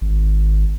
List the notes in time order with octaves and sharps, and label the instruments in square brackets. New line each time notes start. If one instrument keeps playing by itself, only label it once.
[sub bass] G#1